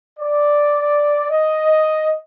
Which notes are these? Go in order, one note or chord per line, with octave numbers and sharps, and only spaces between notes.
D5
D#5